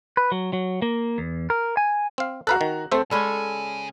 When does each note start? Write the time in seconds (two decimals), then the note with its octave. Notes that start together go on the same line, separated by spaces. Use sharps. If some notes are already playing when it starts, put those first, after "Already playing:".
0.17 B4
0.32 F#3
0.53 F#3
0.82 A#3
1.18 E2
1.50 A#4
1.77 G#5
2.18 C4 F5
2.47 F#4 A4 B4 F5 A#5 F#6
2.61 D#3
2.92 A3 C4 A4 C5 E5
3.11 C#3 G#3 C#4 A4 D5 G#5 B5 D#7